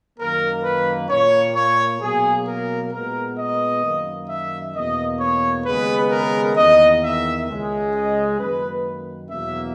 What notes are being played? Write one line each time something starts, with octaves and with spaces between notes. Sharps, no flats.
F#2 D#3 A#3 A#4
B4
A#2 A#3 C#5
C#5
B2 F#3 A#3 G#4
A#4
A#2 G#3 B3 A#4
D#5
F#2 D#3 A#3
E5
E2 B2 A#3 D#5
C#5
D#2 C#3 G#3 B3 B4
A#4
E2 D#3 A#3 D#5
E5
C#2 C#3 G#3
D#5
F#2 D#3 A#3 B4
E2 B2 F#3 A#3 E5